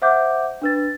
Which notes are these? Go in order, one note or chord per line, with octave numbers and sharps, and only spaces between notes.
C5 E5 F#5 D6 G6
D4 B4 A6